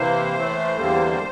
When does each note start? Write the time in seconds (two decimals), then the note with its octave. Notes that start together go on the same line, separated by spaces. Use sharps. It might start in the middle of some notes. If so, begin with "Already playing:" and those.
Already playing: C3 E3 A#3 C5
0.35 A2 E3 A3
0.77 E2 D3 G3 A#3